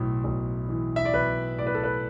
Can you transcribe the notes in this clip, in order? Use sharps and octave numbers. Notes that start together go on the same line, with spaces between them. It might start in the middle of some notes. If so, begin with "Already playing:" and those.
Already playing: B1 A2
B1
E3
E5
D5
B1 B4
A2 D5
B4
A4
B4